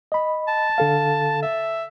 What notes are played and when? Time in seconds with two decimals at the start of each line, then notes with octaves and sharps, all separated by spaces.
0.12 D#5 B5
0.48 A5
0.78 D3 A4 F5
1.43 E5